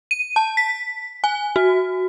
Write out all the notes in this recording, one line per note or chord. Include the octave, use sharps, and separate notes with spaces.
D#7
A5
B6
G#5
F#4